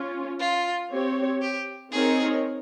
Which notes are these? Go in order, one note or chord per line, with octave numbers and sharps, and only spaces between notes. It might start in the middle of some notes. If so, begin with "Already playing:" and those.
Already playing: C#4 F4
F4
C4 G4 C#5
G4
C4 D#4 G#4 A#4 C#5